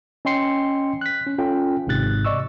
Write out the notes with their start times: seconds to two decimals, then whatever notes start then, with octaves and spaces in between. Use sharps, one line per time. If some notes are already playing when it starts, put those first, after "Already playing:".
0.25 C#4 D#5 G5 C6 C7 C#7
1.01 F#6 B6
1.27 C#4
1.38 C#4 F4 A4 G5
1.87 G#1 G#2 C3 F#6 A6
2.25 D5 D#5 C#6 E6